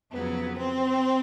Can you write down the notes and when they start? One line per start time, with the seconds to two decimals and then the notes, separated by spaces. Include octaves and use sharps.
0.11 F2 C#3 F#3 B3
0.59 C4